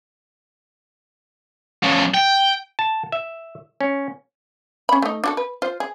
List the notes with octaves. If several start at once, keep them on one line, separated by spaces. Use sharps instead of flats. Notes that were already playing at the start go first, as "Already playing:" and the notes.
F3 C#4
G5
A5
E5
C#4
C#4 B5
A3 D#4
D4 F#4 A4
B4
F4 C5
G#4